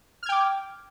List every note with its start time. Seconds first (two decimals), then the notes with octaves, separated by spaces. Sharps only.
0.23 F6
0.26 G#6
0.29 G5
0.32 D6